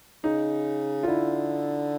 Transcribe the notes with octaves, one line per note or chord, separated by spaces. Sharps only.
C#3 D#4
F4
D3 E4